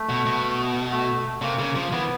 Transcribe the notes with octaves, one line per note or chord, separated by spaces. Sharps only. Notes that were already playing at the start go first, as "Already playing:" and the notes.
Already playing: A3
B2
B2
A3
C3 A#3
C#3
F3
E3 B3